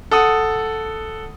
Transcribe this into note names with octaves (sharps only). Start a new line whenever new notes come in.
A4 F#5 D#6